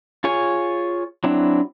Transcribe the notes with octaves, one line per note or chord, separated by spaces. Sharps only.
F4 G#4 C#5 G#5
F#3 C4 D4 E4